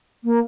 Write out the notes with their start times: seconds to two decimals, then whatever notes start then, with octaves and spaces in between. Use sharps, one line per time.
0.24 A#3